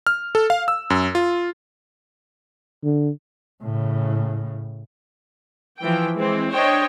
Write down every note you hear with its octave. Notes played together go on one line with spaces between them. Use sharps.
F6
A4
F5
E6
F#2
F4
D3
A2 C#3
E3 F3 G5
E3 G#3 C4
D4 C5 C#5 D#5 G5